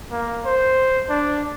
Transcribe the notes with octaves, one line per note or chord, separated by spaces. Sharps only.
A#3
C5
D4